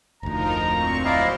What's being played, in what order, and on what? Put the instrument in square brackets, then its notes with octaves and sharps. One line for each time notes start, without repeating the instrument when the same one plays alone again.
[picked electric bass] F1 D2 [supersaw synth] F3 D#4 A#4 [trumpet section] A#5
[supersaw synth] A#2 C4 C#6
[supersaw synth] F#3 C5 [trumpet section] E4 D5 [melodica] D#5 F5 A#5